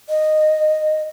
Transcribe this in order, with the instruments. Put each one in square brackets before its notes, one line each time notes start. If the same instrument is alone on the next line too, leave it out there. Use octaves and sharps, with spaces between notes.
[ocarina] D#5